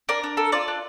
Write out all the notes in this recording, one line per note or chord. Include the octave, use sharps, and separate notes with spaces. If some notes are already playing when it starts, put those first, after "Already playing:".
D4 A#4
D4
A4
F4 D5
D4